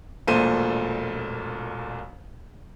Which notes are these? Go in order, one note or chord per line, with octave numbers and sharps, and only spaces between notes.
E1 A#1 A#2 A3 C5 D#7